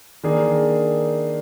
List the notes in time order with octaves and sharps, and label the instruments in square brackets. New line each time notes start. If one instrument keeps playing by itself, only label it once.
[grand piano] D#3 A#3 D4 G#4